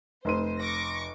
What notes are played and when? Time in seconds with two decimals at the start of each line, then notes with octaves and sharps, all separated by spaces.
0.25 F1 C5 C6 D#7
0.60 C#6 D6 A#6